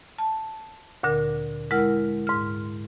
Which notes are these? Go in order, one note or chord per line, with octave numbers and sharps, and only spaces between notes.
A5
D2 A#2 D3 A#4
G#3 E4 A#4 F#5 F6
G#2 F6